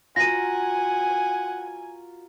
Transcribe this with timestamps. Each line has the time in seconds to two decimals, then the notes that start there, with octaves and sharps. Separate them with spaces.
0.16 F4 F#4 A#4 F#5 G#5 A#6 D#7